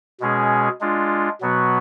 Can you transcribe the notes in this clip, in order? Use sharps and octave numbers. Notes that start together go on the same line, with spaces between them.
B2 G#3 C#4 G#4
G#3 D4 F4
B2 F#3 B3 F#4